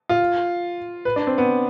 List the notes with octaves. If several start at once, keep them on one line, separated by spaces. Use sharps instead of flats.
F4
B4
D4
C4
B3